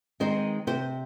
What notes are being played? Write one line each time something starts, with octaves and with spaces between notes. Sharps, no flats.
D#3 G#3 C4 D#4 C5
C3 C5